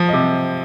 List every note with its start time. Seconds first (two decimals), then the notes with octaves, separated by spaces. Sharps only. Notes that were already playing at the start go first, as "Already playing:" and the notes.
Already playing: F3
0.09 D#5
0.13 C3